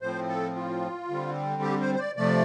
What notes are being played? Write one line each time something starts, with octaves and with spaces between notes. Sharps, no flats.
A2 F3 C4 C5
A4
F4
D3 G3 C4
G4
C5
C5
D5
C3 F3 A3 D5